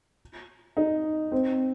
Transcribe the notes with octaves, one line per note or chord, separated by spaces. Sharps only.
D#4
C4